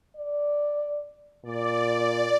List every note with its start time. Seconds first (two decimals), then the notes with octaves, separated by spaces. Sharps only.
0.16 D5
1.45 A#2 D5